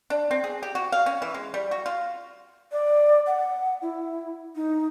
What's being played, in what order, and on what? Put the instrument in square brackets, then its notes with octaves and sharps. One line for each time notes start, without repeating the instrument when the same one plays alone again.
[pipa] D4
C4
G#4
G4
F#4
F5
C#4
E3
G#3
G3
F#4
F4
[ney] D5
F#5
E4
D#4